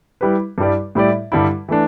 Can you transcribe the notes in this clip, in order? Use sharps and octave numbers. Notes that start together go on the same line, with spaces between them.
G3 E4 G4 B4
G2 G3 E4 G4 D5
A2 G3 E4 G4 D5
G2 D3 G3 E4
E3 A3 D4